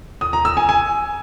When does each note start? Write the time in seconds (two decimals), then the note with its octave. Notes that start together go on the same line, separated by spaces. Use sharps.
0.21 D#6
0.33 A#5
0.45 E6
0.57 G#5
0.69 G#5